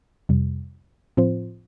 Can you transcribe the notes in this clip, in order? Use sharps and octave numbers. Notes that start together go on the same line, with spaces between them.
F2 C3 G3
A2 F3 C4 F4 C5